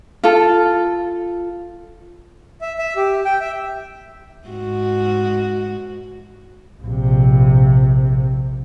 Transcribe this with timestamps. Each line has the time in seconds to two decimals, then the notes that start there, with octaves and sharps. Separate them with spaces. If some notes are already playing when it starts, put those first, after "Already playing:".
0.24 F4 A4
2.61 E5
2.79 E5
2.96 G4
3.25 G5
3.40 E5
4.48 G#2 F#4
6.83 A#1 C3